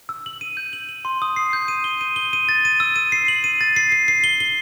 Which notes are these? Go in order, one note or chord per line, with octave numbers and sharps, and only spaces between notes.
E6
F#7
D#7
G6
F#7
F#7
C6
D#6
C7
G6
D#7
G7
D#7
G7
D#7
A6
D#7
E6
D#7
C7
F#7
D#7
A6
C7
C7
C7
G7
G7